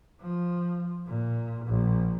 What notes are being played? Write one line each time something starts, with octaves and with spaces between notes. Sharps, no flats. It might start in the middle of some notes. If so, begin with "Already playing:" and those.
F3
A#2
A#1